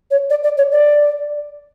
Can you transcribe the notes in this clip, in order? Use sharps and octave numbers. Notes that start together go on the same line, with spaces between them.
C#5
D5
D5
C#5
D5